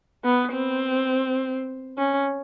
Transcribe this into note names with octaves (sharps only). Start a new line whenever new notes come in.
B3
C4
C#4